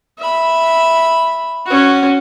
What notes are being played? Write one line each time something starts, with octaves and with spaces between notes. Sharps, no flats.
E5 B5
C#4 F#4